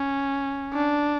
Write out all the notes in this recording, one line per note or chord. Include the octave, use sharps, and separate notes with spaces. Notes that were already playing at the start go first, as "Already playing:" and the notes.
Already playing: C#4
D4